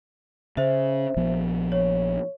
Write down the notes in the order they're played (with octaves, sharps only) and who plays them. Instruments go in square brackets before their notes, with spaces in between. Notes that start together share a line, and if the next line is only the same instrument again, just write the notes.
[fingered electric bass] C#3 [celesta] C5 E5
[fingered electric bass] A#1 F3 B3
[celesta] C#5